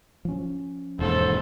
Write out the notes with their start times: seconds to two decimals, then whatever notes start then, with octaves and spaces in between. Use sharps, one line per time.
0.25 F3 C#4
0.99 E1 D#2 G#2 A4 C5